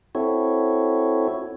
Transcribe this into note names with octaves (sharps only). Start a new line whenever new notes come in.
C4 E4 F#4 A4 C#5